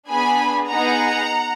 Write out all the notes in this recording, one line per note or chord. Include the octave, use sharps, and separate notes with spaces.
B3 D4 G#4 G#5 B5
B3 D#4 G#4 F#5 A#5